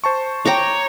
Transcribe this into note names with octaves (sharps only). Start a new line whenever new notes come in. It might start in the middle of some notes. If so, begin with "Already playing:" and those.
C5 A5 C#6
C#5 G5 A#5 D6